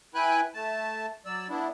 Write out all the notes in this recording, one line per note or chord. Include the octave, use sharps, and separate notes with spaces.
E4 B4 G5 G#5 B5 F#6
A3 A5
F#3 D5 E6
B3 D4 E4